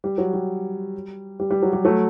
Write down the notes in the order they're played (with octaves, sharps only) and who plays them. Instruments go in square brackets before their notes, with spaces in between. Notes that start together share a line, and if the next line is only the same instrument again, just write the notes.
[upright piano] G3
F#3
G3
G3
G3
F#3
G3
F#3 A3